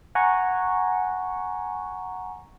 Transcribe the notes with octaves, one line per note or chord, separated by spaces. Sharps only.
F#5 G#5 A#5 C#6